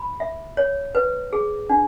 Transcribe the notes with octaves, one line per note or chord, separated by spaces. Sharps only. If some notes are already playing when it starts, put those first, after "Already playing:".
Already playing: B5
E5
C#5
B4
G#4
D4